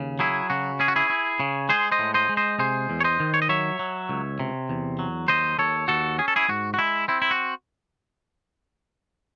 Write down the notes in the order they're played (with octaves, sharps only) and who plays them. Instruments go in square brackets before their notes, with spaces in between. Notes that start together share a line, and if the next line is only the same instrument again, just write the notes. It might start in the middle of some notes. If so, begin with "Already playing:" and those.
Already playing: [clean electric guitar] D#2 C#3
F#3 E4 G#4
C#3 F#4
C#4 G#4
F#4
E4 G#4
E4
C#3
G#3 G#4 C5
C5 D#5
A2
C5 D#5
G#3
C5 D#5
C3 G#4 C5
E2
C#5
C5 D#5
D#3
C#5
D#5
F#3 C#5 E5
F#3
C#2
C3
E2
F#3
D#2 C5 D#5
D#2 A4 C#5
D#2 F#4 A4
C#4 G#4
A4
E4 G#4
G#2 F#4
F#4
G#3 E4
C4 E4
E4
F#4